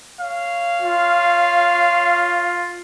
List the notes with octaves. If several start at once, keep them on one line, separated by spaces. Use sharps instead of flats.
C#5 F5
F4